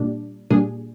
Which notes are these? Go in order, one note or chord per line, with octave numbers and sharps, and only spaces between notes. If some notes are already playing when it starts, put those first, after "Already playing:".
Already playing: A#2 G3 D4
A#2 G3 D4 G#4